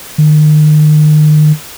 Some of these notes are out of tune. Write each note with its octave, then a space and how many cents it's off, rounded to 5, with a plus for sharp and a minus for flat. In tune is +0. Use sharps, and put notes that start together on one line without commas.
D#3 -40